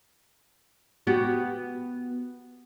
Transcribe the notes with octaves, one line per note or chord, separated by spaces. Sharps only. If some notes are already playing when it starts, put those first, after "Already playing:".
B3 F#4 G4